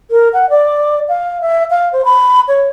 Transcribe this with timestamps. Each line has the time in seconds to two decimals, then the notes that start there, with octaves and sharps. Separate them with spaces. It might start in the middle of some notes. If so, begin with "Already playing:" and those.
0.11 A#4
0.33 F#5
0.50 D5
1.09 F5
1.41 E5
1.70 F5
1.93 C5
2.05 B5
2.48 C#5